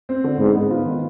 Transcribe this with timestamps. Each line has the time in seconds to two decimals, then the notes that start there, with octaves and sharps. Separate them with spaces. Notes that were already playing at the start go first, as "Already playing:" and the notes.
0.09 C4
0.24 D3
0.39 G#2 B3
0.55 B3
0.71 F4
0.86 D#3